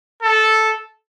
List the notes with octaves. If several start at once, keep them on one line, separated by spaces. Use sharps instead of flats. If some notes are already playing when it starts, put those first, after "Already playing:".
A4